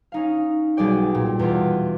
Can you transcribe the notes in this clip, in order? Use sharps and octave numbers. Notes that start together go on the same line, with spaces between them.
C#4 D#4 F5
B1 G3 G#4 D5 G5
A#2
E2 B2 F4 D5